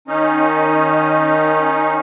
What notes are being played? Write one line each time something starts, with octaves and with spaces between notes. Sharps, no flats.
D#3 C#4 D#4